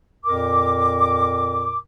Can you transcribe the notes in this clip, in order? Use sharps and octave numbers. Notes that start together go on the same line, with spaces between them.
F2 A#2 A#4 D6